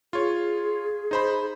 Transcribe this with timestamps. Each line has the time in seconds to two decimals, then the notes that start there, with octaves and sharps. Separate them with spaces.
0.13 F4 G#4 C#5
1.11 D#4 C5 B5